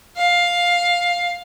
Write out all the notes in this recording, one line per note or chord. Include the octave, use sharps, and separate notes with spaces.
F5